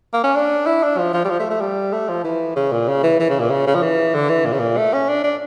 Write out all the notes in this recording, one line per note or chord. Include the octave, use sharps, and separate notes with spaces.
A#3
C#4
D4
E4
D4
F3
F3
G3
F3
A3
A3
G3
A3
F3
E3
C#3
A#2
C#3
E3
E3
C#3
A#2
C#3
C#3
F3
E3
D3
E3
A#2
C#3
A#2
A3
C#4
D4
D4